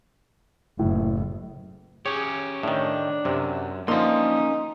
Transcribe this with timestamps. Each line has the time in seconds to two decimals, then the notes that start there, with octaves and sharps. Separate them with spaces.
0.79 F#1 A2
2.06 C#4 G4 G#4 C#5
2.63 A2 D#3 D4
3.25 F#2 C3
3.88 D3 F3 A#3 C#4 D#4 C6